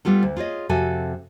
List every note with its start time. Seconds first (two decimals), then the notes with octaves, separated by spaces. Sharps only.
0.05 G3 B3 F4 A4
0.23 D2
0.37 F4 G#4 C#5 D#5
0.69 F2 C3 F#4 A4 G#5